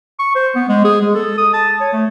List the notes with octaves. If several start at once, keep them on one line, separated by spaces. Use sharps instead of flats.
C#6
C5
B3
G#3
G#4
G#3
A4
D#6
A5
C#5
A3